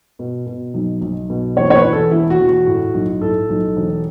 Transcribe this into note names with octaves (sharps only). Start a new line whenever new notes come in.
B2
B2
B1
B1
B2
E2 C#5
C#5
B4
E2
A4
E1 E4
F#4
E1
F#4
A2
B1
A2 A4
B1
E1